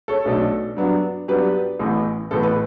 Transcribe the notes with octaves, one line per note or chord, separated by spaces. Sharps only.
A4 C#5
B1 B2 A3 D4
G2 F#3 B3 D4
G2 F#3 B3 D4 G4 B4
A1 A2 E3 B3
A1 A2 E3 B3 A4
B4